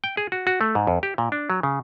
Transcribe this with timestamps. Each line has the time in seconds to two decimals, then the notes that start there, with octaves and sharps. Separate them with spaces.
0.04 G5
0.17 G#4
0.32 F#4
0.47 F#4
0.61 A3
0.75 G#2
0.87 F2
1.03 G4
1.18 A#2
1.32 D4
1.50 F#3
1.63 C#3